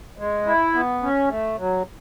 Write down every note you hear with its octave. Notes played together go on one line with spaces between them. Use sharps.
G#3
E4
B3
C#4
A3
F#3